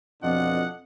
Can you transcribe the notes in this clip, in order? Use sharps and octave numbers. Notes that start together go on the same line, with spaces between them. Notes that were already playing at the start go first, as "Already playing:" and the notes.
F2 B2 C4 D4 F4 D#5 F#5